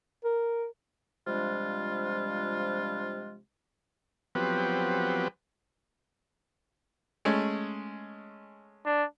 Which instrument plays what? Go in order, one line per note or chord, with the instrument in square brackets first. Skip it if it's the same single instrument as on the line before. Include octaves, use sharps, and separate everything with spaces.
[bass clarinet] A#4
[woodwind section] C3 F3 G3 G#3 D4 F4
[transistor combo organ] F3 F#3 B3 C4 G4 B4
[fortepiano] G#3 A3 C#4
[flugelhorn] D4